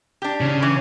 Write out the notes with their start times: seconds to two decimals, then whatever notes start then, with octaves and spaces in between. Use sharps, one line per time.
0.22 D4 G4
0.41 C#3
0.63 E3